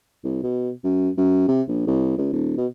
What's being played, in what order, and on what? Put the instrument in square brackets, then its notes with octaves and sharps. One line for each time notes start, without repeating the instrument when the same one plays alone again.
[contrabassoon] C2
B2
F#2
F#2
C3
A#1
C2
C#2
D#1
B2